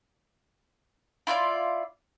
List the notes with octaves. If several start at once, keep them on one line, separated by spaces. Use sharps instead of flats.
E4 F4 C#5 D5